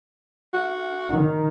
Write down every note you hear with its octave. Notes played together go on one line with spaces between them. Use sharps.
F#4
D#3